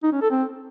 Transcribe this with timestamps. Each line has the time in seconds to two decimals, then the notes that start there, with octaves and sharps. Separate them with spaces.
0.03 D#4
0.12 C#4
0.22 A4
0.31 C4